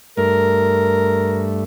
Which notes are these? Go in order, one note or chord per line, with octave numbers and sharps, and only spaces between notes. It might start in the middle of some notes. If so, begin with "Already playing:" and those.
G2 A3 A#4